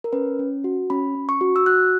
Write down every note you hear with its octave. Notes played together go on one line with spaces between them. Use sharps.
A#4
C#4 B4
C#4
F#4
C#4 B5
C#4
C#6
F#4
E6
F#4 F#6